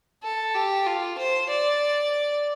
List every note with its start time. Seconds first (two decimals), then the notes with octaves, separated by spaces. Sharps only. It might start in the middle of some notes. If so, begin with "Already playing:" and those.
0.24 A4
0.55 G4
0.87 F4
1.18 C5
1.50 D5